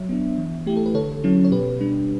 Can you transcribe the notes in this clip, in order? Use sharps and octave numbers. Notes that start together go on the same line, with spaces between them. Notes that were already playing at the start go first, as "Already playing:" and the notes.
Already playing: F#3 C#5 E5
B3 D4
E3
A3 E4 G4
A4
B4
D3 A4 C#5
F#3 C#4 E4
C#5
B2 G4 B4
G3 D4